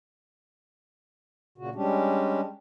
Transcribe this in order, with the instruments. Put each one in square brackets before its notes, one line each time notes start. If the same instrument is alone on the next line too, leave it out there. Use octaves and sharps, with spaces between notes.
[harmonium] A#2 C#3 F#4
G3 G#3 C#4 D4 G4